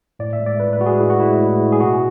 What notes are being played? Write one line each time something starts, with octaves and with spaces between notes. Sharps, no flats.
A2 D5
E5
G#3
D5
A2 B4
B4
G#3 F#4
G#4
A2 E4
F#4
G#3 E4
A2
G#3
G#4
B2 F#4